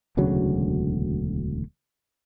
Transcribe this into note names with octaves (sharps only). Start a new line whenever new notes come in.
E1 D2 C#3 F#3